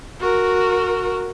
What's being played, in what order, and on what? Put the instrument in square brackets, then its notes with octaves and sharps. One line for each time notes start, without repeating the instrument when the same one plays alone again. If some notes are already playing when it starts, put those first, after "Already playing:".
[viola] F#4 A#4